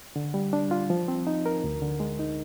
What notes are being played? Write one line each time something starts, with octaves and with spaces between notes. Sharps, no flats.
D3
G3
D4
F4
F3
C4
D#4
A#4
D2
D3
G#3
D#4